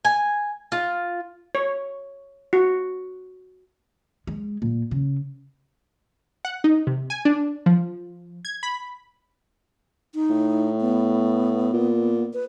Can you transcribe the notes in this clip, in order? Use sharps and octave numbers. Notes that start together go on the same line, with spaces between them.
G#5
F4
C#5
F#4
G#3
A#2
C#3
F#5
D#4
C3
G#5
D4
F3
G#6
B5
D#4
A2
B3
A#2
B4